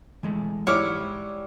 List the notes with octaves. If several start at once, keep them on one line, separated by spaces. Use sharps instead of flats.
E3 G#3 A3
G#2 G3 E4 C#5 D6 F6